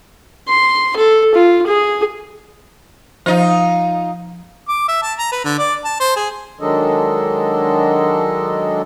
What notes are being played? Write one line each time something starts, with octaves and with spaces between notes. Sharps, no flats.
C6
A4
F4
G#4
F3 D#4 F4 C5
D6
E5
A5
A#5
B4
D3
D5
A5
C5
G#4
D#3 F#3 G#3 D4 A4 D#5